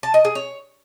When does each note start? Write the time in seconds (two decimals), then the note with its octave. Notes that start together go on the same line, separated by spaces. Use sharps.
0.03 A5
0.14 D#5
0.25 G#4
0.35 C#5